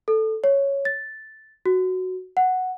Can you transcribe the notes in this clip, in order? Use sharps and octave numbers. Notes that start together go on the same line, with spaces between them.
A4
C#5
A6
F#4
F#5